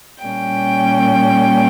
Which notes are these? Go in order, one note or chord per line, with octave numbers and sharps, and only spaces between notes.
A#2 G3 A#3 C#4 G5